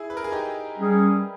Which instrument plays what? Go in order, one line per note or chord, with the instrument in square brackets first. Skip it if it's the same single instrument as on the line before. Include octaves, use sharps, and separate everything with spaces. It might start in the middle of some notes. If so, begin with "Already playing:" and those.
Already playing: [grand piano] E4 G#4
B4
A#4
G#4
D#4 G4
[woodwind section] G3 C#4 G#4